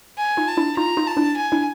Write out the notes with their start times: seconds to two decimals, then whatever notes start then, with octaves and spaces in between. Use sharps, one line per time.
0.17 G#5
0.37 D#4 F4
0.47 A5
0.57 D4 E4
0.77 D#4 F4 A#5
0.97 D#4 F4
1.07 A5
1.17 D4 E4
1.37 G#5
1.52 D4 E4